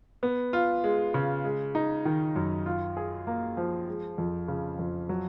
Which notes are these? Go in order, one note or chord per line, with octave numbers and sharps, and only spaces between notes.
B3
F4
G#3
C#3
G#3
D#4
D#3
F#2
F4
G#4
A#3
F3
G#3
F2
C#3
F2
F#3